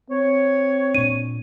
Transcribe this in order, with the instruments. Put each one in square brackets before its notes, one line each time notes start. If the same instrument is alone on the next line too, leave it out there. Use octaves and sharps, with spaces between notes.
[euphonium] C4 [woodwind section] C#5
[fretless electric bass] A#2 D4 [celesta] D#7